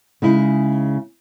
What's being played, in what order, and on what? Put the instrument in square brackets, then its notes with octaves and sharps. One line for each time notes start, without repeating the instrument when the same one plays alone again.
[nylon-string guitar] C#3 G#3 D#4 E4